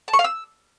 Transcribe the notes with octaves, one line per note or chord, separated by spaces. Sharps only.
A5
C#6
F5
E6